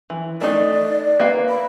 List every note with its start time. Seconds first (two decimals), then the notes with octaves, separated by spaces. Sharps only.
0.10 E3
0.41 A3 D#4 D5
1.19 A#3 B4 F5
1.49 B5